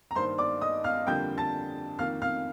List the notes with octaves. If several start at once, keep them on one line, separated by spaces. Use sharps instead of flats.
A#5
G2 D#3 A#3 C5 C6
D5 D6
D#5 D#6
F5 F6
F2 D3 G3 A#3 G5 G6
A5 A6
F2 D#3 A#3 F5 F6
F5 F6